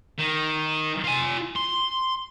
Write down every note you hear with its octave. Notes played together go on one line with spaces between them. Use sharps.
D#3
F4 G#5
C6